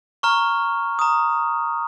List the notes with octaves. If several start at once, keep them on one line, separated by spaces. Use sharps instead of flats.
A#5 C#6 F6
A#5 D#6